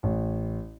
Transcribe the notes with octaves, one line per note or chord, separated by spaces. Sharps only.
A1